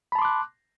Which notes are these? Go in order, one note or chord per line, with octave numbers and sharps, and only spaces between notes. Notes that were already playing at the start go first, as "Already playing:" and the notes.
A5 B5 C6 D6 F#6